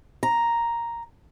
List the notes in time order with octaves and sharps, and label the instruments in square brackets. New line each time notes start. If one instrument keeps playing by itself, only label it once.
[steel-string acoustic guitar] A#5